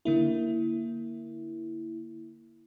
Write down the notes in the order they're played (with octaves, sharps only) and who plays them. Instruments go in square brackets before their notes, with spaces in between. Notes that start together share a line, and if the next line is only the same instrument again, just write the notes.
[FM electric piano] D3 A#3 E4